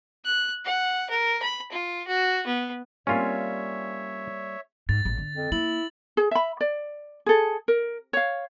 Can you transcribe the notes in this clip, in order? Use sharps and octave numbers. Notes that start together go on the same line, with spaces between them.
F#6
F#5
A#4
B5
F4
F#4
B3
G3 A#3 C4 C#4 F4 C#5 E5
G#2 A6
G#1 A2
D3
F2
A#3 E4 F#7
G#4
E5 B5
D5
G#4 A4
A#4
C#5 F5